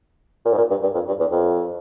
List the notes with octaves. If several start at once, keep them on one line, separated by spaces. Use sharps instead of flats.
A#2
G#2
A#2
G2
G2
F2
G2
E2
F2